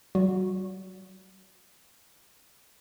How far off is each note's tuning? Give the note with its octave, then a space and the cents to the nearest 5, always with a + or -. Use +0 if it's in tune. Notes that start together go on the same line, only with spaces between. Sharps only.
F#3 +45 F#4 -20